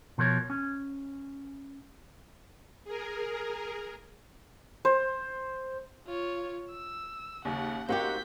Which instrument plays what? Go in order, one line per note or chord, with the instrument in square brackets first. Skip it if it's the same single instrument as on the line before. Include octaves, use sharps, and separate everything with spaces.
[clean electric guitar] B2 F3 A#4 C#5
C#4
[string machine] G#4 A#4
[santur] C5
[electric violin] F4 C#5
E6
[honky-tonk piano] D#2 C#3 [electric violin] F#5
[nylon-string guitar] A#3 D#4 G4 [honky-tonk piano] C4 F#4 F#5 [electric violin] G6 B6